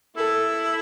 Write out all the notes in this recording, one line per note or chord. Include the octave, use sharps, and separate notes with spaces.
E4 A4